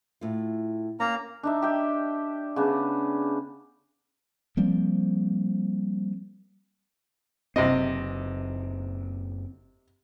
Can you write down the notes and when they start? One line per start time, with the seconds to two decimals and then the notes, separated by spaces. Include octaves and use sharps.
0.21 A2 F4
1.00 A#3 C#4 A#5
1.43 D4 D#4 E5
1.62 G4 E5 G5
2.56 C#3 B3 D4
4.57 F3 G3 A#3 C4
7.56 F#1 C3 C4 D#5